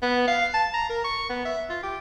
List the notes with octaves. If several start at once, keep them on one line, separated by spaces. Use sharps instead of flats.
B3
F5
A5
A#5
A#4
C#6
B3
E5
F4
G4